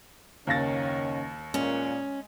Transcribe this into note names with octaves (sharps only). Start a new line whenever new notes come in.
F#1 D#2 D#3 C#4 F5 A6 A#6
A#2 G#3 C#4